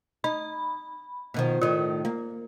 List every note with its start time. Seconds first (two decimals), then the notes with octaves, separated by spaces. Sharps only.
0.24 D#4 B5
1.34 B2 D#3 F3
1.62 A2 D#3 F4
2.05 A#3